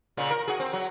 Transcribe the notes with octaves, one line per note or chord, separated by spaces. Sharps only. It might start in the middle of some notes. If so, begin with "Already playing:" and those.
A#2 C#3
A#4
F#4 G#4
C4
F#3